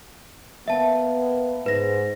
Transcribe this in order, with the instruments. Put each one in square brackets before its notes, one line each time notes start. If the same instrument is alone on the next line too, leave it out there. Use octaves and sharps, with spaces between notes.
[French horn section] A#3 B3 [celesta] E5 A5
[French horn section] G#2 [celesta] B4 A#6